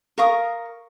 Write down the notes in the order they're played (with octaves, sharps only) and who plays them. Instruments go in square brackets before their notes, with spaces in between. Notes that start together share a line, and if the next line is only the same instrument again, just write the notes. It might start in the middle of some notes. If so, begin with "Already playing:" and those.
[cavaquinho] A#4 F5 C#6 D#6